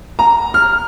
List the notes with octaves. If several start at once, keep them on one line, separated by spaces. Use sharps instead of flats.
A#5
F6